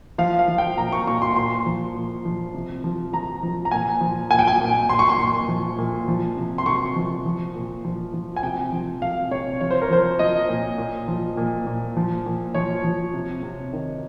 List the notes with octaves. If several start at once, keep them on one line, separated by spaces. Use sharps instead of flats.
F3 F5
F5
F3
G5
A#2 A#5
C#6
A#2 C#6
C6
A#2 C6
F3
A#2
F3
C3
F3
F3 A#5
F3
A#5
A#2 G#5
F3
A#2 G#5
G5
G#5
A#2
A#2 C6
C#6
C6
A#2
F3
A#2
F3
C3
C6
C3 C#6
F3
F3
A#2
F3
F3
G#5
C3 G5
F3
C3 F5
C3 C#5
F3 C#5
C5
A#4
F3 C5
F3 D#5
A#2
A#2
F3
A#2
A#2
F3
A#2
F3 C#5
F3
C3
C3
D#3